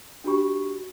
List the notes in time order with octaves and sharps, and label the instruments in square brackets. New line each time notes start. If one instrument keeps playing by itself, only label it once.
[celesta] D4 F#4 G4 B5 C#6